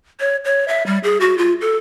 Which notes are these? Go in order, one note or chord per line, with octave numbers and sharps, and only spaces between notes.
C#5
C#5
E5
G3
G#4
F#4
F4
A4